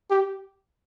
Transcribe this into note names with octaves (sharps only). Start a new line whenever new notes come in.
G4